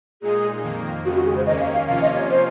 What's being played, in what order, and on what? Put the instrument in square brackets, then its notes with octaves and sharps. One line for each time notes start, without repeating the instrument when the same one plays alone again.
[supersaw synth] A#2 G#3 D#4 [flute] G#4
[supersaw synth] F2 D#3 A#3
[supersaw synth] F2 C#3 G#3 [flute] F#4
[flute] F#4
G#4
C5
[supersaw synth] D#2 D#3 A#3 C#4 [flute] D#5
[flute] F5
F5
[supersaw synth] C3 F3 A#3 C#4 F4 [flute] F5
[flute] D#5
C#5
C5